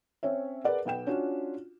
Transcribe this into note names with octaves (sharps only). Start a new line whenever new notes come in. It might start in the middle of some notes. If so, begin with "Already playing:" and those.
C4 C#4 C#5 E5
G#4 A#4 B4 D5 F#5
B1 B3 G5 E7
C#4 D4 F4 F#4